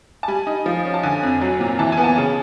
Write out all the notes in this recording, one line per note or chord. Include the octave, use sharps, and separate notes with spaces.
A5
G3 G#5
D#4
F3
C#4
A5
D3 G#5
F2
F#3
A#2
E3 A5
G#5
B3
A5
C#3